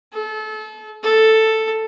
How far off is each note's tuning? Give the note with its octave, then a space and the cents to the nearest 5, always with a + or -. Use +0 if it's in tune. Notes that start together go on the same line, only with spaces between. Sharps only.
A4 -30
A4 +5